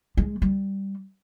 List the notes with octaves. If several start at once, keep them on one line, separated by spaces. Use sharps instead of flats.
G#3
G3